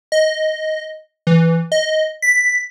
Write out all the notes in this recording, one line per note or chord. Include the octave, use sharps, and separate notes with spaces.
D#5
E3
D#5
B6